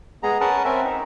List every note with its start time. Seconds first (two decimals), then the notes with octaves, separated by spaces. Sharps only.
0.23 G#3 B3 G#4 A#5
0.41 C#4 A#4 B4 F#5 A5
0.65 C4 C#4 A#4 E5
0.84 D#4